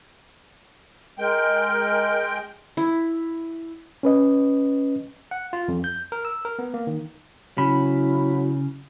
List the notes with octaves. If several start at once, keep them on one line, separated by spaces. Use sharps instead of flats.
G#3 A#4 G5
E4
C#4 B4 D#5
F#5
F4
F2
G6
A#4
E6
A#4
B3
A#3
D#3
C#3 F#3 E4 B5